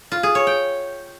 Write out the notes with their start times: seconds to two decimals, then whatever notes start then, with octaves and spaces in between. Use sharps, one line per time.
0.12 F4
0.23 G#4
0.35 C#5
0.47 G5